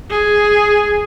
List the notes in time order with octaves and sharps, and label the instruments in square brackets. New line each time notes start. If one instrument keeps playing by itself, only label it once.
[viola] G#4